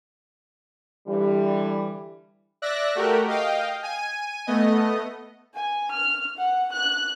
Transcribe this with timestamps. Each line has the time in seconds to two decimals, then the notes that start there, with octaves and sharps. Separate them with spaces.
1.07 D3 E3 G3
2.62 D5 E5 F#6 A#6
2.95 A3 F#4 G4 A#4
3.28 D#5 F5 G5
3.83 G#5 D#7
4.47 A3 B3 D#5
5.55 G#5
5.91 F6
6.37 F#5
6.73 F#6